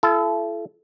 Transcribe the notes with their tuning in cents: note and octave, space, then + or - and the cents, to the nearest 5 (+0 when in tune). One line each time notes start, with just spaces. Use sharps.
E4 +45 A4 -25